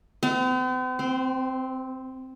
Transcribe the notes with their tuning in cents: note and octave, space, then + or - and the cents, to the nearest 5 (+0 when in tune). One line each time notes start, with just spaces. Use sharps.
C4 -45
C4 -5